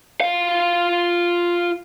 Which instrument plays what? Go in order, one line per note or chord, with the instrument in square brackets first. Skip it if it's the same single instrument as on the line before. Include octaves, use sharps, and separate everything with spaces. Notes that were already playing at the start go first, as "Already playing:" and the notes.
[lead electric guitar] F4 F5